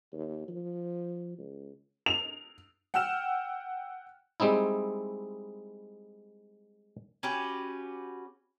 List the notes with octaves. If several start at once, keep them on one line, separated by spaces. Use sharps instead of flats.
D#2
F3
C#2
F7
F#5 G5 E6 F6 E7
G3 G#3 C4 D#4 E4
C#4 F#4 G4 B4